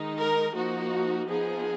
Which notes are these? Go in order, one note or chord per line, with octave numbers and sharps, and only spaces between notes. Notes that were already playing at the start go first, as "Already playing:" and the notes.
Already playing: D#3 G#3 D#4
A#4
F3 A#3 D#4 F#4
F3 B3 D#4 G#4